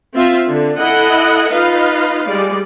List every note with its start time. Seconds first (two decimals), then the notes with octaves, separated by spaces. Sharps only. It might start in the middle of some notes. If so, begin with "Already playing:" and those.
0.14 C4 F4 E5
0.48 D3
0.78 E4 A4 D#5 F#5
1.52 D#4 F4 B4 D#5 F5
2.27 G3 G#3 D5